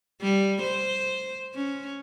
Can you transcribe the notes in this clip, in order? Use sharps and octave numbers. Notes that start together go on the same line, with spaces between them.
G3
C5
C#4